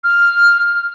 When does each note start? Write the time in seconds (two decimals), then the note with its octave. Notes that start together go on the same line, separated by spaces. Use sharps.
0.04 F6